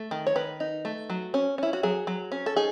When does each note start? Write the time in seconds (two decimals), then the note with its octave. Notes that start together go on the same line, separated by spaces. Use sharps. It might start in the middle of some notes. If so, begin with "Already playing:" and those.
Already playing: A3
0.11 D#3
0.27 C#5
0.36 D#3 B4
0.60 D#4
0.85 A3
1.10 F#3
1.34 C#4
1.58 C#4 E4
1.73 F#4
1.83 F#3 G#4
2.07 F#3
2.32 C#4
2.46 A4
2.56 D#4 G#4